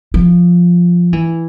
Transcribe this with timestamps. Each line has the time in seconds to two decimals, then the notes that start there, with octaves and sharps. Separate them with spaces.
0.14 F3
1.13 E3